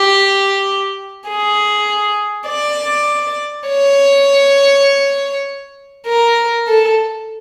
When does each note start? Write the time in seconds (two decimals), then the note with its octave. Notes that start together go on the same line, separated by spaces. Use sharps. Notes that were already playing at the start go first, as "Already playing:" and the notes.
Already playing: G4
1.29 G#4
2.48 D5
3.68 C#5
6.07 A#4
6.68 A4